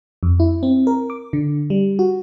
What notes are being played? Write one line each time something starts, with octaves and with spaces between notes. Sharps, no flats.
F2
E4
C4
A#4
D6
D3
G3
F#4